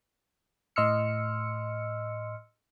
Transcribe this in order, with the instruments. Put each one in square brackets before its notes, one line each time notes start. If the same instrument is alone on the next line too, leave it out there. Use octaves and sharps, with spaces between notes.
[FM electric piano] A2 D#5 C6 E6 F6 C#7